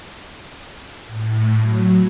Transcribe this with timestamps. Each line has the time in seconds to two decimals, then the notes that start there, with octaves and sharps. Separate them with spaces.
1.07 A2
1.60 F#3